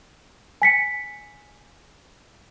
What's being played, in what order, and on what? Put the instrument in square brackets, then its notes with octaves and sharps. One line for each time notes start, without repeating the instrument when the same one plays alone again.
[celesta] G#5 B6 C#7